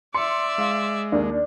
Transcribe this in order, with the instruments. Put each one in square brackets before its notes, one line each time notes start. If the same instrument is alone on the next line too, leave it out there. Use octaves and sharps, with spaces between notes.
[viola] D5 E5 [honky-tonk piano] C6 [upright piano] C#7
[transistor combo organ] G#3 [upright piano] F5
[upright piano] D#2 A#4 [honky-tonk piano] D4